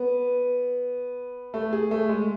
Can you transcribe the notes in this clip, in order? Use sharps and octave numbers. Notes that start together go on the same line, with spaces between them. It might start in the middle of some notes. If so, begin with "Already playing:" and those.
Already playing: B3
A3
G#4
A3
G#3